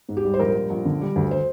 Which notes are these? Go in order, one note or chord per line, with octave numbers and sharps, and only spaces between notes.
G#2
G4
G3
C5
A#1 A#4
G3
A#1
D3
G3
D2
C5